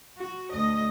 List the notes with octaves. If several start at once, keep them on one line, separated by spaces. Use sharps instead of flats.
F#4
D2 D#5